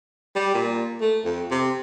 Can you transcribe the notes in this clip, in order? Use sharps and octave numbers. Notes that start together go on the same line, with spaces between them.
G3
A#2
A3
F2
C3